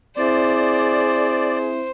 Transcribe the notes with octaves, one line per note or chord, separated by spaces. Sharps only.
C4 E4 G#4 C5 D5 E5